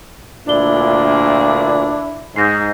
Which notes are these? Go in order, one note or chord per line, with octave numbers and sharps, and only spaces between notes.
D2 A#2 D4 E4 D5 G7
G#2 D#4 G6 A#6 C7